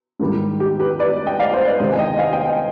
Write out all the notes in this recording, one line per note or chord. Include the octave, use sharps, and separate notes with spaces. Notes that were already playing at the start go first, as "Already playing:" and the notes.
G#2 D#3 G3
G4
G4 B4
B4 D5
D#5 G5
D5 F5
C5 D#5
B4 D5
C3 D#3 G#3 C5 D#5
G#5
D#5 G5
F5 G#5
D#5 G5
D#5 G5